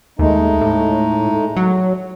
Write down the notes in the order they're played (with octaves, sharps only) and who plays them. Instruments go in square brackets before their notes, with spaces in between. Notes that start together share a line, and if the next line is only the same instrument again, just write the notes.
[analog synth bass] D#2 [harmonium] G#3 A3 D#4
[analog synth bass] A2
F#3